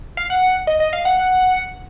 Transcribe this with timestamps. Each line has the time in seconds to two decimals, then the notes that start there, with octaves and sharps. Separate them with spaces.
0.17 F5
0.30 F#5
0.67 D#5
0.80 D#5
0.93 F5
1.05 F#5